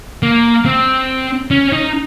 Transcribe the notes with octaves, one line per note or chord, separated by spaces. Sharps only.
A#3
C4
C#4
D#4